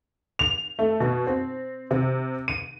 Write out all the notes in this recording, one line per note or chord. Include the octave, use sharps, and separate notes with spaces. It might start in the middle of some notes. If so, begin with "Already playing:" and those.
F7
A3
B2
C4
C3
D#7